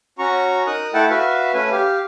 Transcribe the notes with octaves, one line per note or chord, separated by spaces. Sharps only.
C#4 F#4 A#5 C#6
D#4 A#4 D#6 F#6
A3 E4 A4 F#5 G5 A5
F#4 B4 E5 F5
A3 C#4 B4 G#5
G4 F5